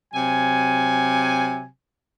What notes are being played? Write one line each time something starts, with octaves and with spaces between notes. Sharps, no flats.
C3 F#3 G#5